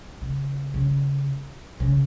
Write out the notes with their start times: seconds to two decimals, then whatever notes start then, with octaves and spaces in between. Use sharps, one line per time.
0.21 C#3
0.74 C#3
1.80 C#3